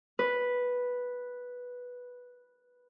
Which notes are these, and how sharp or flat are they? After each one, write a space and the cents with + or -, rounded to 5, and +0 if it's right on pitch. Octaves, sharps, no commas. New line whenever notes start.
B4 -5